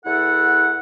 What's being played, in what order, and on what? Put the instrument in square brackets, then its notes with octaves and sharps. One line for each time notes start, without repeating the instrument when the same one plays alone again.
[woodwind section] E2 E4 A4 F#5